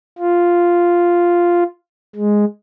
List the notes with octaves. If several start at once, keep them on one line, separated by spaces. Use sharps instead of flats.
F4
G#3